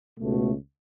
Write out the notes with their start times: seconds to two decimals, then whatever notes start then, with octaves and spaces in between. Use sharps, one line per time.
0.19 C#2 B2 A3